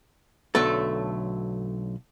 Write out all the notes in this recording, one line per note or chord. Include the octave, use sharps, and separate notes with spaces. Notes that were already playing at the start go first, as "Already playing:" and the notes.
B1 D3 F#3 A3 A4